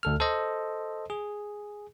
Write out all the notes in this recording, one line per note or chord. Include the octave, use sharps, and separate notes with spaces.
D2 A4 F6
A4 C5 D#5
G#4